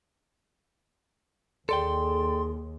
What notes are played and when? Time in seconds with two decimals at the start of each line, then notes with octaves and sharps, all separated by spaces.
1.69 D#2 G#4 A4 D5 G5 C6